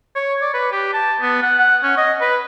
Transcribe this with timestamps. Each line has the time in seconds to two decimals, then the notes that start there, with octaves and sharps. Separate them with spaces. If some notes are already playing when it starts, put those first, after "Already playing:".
0.15 C#5
0.41 D5
0.54 B4
0.72 G4
0.93 A5
1.21 B3
1.43 F#5
1.59 F#5
1.83 C#4
1.97 D#5
2.21 B4